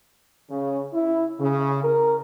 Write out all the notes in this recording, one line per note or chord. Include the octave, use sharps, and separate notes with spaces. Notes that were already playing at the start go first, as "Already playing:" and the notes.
C#3
E4
C#3
A#4